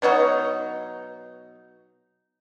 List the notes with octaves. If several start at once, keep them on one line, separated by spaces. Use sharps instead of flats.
B2 F#3 D#4 F#4